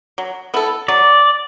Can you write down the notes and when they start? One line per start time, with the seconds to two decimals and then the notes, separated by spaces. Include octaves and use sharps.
0.18 F#3
0.54 B3 E4 A4
0.88 F#3 D5